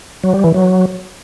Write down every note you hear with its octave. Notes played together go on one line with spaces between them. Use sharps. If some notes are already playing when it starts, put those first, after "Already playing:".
F#3
G3
E3
F#3